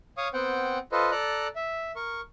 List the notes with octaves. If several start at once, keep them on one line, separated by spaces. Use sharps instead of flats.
C#5 F5 C#6 D#6
B3 C4 C5 F#5 G5
F4 A4 B4 C5 D#5
A4 D5 A#5 F#6
E5
A#4 C#6